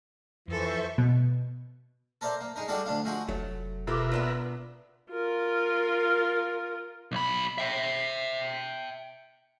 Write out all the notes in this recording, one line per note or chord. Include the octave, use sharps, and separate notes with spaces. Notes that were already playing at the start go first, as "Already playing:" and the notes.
F2 E3 F3 A4 C5 E5 C#6
B2
A4 A#4 C5 D5 E5
A#3
G#3 D#4 A#4
G3 G#3 D4 E4 F#4 A4
D2 D4 F5
F3 G#3 E4 F#4
F1 F#3 A3
B2 F4 G4 A#4 B4 E5 D6
B3 D4 F4
F4 A#4
B1 B5
E5 G5